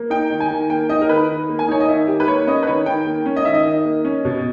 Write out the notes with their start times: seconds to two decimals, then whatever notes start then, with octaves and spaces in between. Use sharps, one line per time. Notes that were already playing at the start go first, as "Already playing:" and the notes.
Already playing: A#3
0.10 D#4 G5
0.30 D#3
0.40 G#5
0.51 D#3
0.70 A#3 G5
0.89 D#4 D#5
1.01 A#4
1.09 D#3 B4
1.29 D#3
1.49 A#3
1.59 G#5
1.68 D#4 C#5
1.80 D#5
1.88 D#3 E5
2.07 D#3 G4
2.20 B4
2.28 A#3 C#5
2.47 C#4 D#5
2.63 B4
2.67 D#3 C#5
2.86 D#3 G5
3.06 A#3
3.26 C#4
3.36 D#5
3.45 D#3 E5
3.54 D#5
3.65 D#3
3.85 A#3
4.05 C#4
4.25 B2